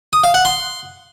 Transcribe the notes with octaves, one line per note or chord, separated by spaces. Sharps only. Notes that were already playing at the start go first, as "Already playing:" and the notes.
D#6
F5
F#5
C6